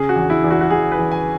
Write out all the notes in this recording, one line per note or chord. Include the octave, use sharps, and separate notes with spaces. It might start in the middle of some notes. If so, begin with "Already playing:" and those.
Already playing: C#3 G#4
F#4
E2
E4
E2
F#4
F#4
E2 G#4
B4
E2
G#5